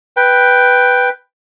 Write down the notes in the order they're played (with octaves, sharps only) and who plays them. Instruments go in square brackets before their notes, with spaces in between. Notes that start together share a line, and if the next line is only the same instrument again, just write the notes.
[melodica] B4 G5